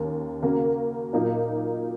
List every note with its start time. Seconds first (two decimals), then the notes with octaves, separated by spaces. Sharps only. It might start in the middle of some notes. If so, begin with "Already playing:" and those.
Already playing: D#2 D#3 A#3 C#4
0.42 C#3 A#3 F#4 A#4
1.13 A#2 F#3 A#3 D#4